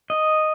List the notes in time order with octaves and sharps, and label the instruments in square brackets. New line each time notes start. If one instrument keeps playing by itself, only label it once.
[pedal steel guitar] D#5